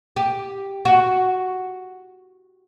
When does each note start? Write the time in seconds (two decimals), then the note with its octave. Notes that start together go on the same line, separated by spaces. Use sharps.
0.16 G4
0.85 F#4